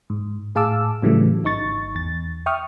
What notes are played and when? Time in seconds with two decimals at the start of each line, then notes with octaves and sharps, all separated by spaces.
0.10 G#2
0.55 A2 G#4 F5 A5 D6 E6
1.02 A2 C#3 E3 F#3 G3 A3
1.44 G#1 D#4 C#6 A6
1.95 E2 A6
2.46 E5 G5 C#6 D#6 F6